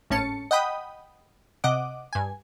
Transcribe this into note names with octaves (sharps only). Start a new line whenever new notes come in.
G#1 A2 C#4 A5 C#7
D#5 F#5 G5 B5 D#6
C3 D#5 F#5 D6
G2 G#5